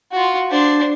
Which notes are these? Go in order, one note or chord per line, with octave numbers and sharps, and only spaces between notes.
F4 F#4
D4 C5